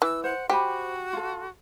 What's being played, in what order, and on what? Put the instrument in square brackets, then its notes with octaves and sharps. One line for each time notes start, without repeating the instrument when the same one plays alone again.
[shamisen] E3 [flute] E6
[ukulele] C5 [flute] F#5
[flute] F#4 [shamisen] G4 [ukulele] C5 G#5 B5
[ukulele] F4 A4